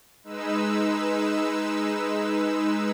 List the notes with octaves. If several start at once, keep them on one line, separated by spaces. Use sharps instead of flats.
G#3 D#4 B4 E6